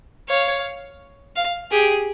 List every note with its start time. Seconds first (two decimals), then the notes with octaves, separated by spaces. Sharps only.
0.29 C#5 F5
1.36 F5
1.71 G4 G#4